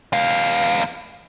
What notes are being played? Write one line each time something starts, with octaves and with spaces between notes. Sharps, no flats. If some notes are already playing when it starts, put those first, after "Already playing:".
E2 F5